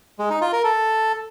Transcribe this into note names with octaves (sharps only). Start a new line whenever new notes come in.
G#3
D#4
F4
A#4
A4